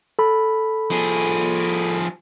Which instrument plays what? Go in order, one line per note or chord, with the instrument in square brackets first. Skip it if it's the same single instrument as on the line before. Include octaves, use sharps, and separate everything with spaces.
[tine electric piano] A4 B5
[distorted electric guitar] F3 G#4